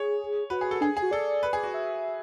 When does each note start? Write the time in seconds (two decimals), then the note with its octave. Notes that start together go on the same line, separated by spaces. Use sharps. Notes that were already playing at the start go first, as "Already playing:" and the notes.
Already playing: G#4 C#5
0.50 F#4 B4
0.61 G#4
0.71 A4
0.81 D4 G#4
0.97 G#4
1.02 F#4
1.11 A4 D5
1.43 B4
1.53 G#4
1.63 F#4
1.74 E5